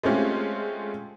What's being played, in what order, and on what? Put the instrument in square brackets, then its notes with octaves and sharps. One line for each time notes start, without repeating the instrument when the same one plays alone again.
[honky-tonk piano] G#3 A3 C4 C#4 F4 G4